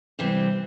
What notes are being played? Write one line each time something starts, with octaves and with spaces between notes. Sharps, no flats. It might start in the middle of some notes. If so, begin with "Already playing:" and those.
C3 E3 G3 C4